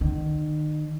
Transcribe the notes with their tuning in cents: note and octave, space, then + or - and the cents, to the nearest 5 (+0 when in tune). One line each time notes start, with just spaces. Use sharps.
D#3 -35